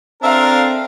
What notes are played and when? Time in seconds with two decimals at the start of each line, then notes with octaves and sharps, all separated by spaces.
0.23 C4 D4 F4 A4 A#4 E5 F5